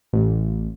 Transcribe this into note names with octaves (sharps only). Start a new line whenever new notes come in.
A1